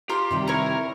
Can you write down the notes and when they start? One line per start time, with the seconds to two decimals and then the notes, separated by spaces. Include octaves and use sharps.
0.09 F4 G4 A#5 C6
0.31 C3 D#3 G3
0.48 E4 A#4 C#5 A#5